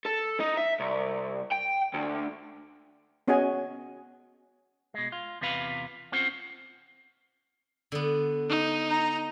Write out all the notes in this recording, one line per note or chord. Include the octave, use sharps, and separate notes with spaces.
A4
D#4
E5
C2
G5
D2
B3 C#4 F#4 G#4 D#5 G#5
B2 G#3
F4
E2 C3 F4 B4 F5 B5
C4 C#4 F4 C5 F#5
D3 B3
D#4
A#5